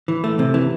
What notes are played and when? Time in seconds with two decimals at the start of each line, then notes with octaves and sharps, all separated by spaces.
0.08 E3
0.24 A3
0.39 C3
0.54 E3